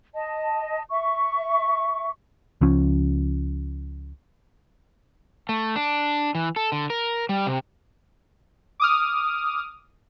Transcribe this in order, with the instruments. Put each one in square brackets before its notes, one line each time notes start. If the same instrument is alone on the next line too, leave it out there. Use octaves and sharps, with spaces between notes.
[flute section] D#5 A5
E5 C#6
[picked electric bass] C#2 F3 C#4
[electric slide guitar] A3
D4
E3
A4
D3
A#4
G3
C3
[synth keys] D6 D#6 F6